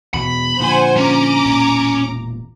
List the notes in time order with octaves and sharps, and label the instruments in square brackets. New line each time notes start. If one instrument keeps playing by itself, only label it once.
[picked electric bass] E2 B2 [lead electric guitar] B5
[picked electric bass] A#2 D3 F3 [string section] C5 F#5 G#5
[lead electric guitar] C#4 [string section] A#5 D6
[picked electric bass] E1 A#2